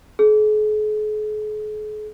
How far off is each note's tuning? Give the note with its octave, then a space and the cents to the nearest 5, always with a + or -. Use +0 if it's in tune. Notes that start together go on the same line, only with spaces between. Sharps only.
G#4 +45